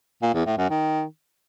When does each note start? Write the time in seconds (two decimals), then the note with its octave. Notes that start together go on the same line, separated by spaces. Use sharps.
0.22 A#2
0.34 E2
0.46 A2
0.58 F#2
0.70 D#3